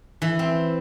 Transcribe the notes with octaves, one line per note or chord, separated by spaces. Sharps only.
E3
C4